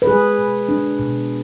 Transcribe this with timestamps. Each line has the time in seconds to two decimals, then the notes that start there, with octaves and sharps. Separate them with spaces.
0.02 B4
0.07 G#3 G#4
0.38 B2
0.69 D4
0.99 B2